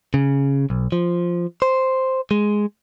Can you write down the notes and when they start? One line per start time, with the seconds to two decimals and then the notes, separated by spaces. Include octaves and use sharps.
0.14 C#3
0.70 B1
0.92 F3
1.62 C5
2.31 G#3